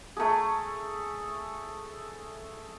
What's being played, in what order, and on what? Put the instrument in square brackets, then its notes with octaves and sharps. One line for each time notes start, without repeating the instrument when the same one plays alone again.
[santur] A3 G#4